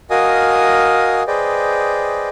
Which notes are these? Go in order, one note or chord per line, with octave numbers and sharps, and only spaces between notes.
F#4 A#4 D#5 F5 G#5 D#6
G#4 B4 C5 D5 D#5 G5